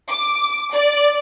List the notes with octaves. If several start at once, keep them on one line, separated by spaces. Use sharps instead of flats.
D6
D5